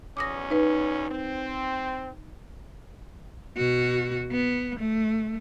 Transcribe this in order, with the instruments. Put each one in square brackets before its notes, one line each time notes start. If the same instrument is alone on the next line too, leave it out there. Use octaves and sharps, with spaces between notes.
[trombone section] B1 E2 C#4 [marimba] D6 D#6 A#6
[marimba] D#4 B4
[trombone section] C4
[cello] B2 F#4
B3
A3